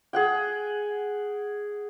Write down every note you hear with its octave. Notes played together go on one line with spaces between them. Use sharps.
G#4 F#5 G5